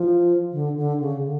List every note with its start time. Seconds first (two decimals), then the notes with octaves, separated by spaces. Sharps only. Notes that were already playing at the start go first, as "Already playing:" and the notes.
Already playing: F3
0.53 D3
0.77 D3
1.00 C#3
1.23 D3